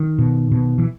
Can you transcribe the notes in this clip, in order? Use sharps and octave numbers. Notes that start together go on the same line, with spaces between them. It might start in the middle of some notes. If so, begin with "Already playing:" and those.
Already playing: D#3
B2
B2
E3